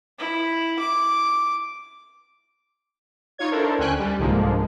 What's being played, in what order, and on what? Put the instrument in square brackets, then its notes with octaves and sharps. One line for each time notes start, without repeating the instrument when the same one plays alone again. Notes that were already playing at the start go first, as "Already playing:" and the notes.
[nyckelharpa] E4
D6
[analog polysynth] D#4 F4 C#5 G#6
D4 E4 A4 A#4 C5
D2 D3 C#4 G5 G#5 F#6
G3
C2 G#2 D3 F3 G#3 A#3